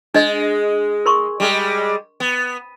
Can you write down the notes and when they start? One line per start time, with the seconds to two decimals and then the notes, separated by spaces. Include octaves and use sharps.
0.14 G#3 D4 D#5
1.06 A#4 C6 C#6
1.40 G3 G#3
2.20 B3